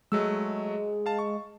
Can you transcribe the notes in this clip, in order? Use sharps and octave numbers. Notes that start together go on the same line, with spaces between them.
F#3 G#3 A3 E6
F5 A5
C#6